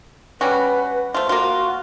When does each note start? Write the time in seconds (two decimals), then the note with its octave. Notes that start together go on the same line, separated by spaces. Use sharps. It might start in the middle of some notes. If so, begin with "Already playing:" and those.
0.41 G3 C#4 F#4 B4
1.14 A3 F4 C5
1.29 A#3 F4 F#4